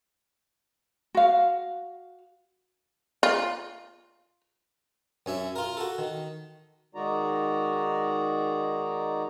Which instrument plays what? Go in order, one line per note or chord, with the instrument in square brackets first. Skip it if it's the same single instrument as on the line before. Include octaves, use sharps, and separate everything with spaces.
[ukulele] F#4 F5
[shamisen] F4
[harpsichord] F#2 C#4 E5
F4 A#4
F#4 A4
D#3
[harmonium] D#3 G#3 D#4 F#4 D5 A#5